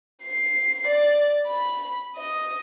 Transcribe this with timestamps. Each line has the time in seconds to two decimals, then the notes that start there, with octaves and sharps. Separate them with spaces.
0.22 C7
0.87 D5
1.47 B5
2.16 D#5